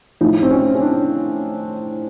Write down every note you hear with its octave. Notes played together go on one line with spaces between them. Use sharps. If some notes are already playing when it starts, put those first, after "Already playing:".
A2 F3 D#4
C4
C#4
C#4
D4